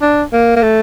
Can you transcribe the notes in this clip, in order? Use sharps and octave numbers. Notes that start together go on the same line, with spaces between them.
D4
A#3
A#3
A3